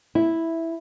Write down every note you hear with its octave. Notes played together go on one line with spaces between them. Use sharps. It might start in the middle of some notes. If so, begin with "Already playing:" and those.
E4